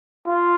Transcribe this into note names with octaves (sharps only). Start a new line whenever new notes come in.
F4